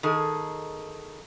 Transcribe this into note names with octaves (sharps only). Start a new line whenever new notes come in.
D#3 G#4 A4